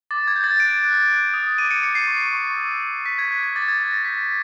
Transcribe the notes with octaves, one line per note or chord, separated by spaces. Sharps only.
D6 A6
G#6
G6
A6
F#6 D7
F#6
F#6
D#6
D6 D#7
C#7
D6 C#7
C7
C#6
C#6
E6
E6
D6 B6
G#6
F#6
G#6
D6 A6
G#6
G6 A6
A#6
G6 B6